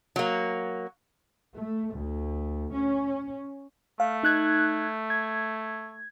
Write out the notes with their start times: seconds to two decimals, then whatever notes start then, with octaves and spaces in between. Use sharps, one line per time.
0.16 F#3 A#3
1.56 A3
1.95 D2
2.73 C#4
4.00 A3 F5
4.23 D#4 F#6 G#6
5.10 G#6